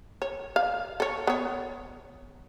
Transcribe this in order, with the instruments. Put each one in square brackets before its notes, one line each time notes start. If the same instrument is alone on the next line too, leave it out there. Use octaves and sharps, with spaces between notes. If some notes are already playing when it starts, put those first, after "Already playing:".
[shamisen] C#5
F5
A4 C#5
B3 C#5